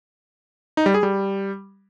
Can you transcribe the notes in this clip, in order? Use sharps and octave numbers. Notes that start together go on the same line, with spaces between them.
D#4
G3
G#4
G3